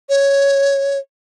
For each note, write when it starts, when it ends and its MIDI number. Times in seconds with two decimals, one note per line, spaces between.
0.09 0.98 73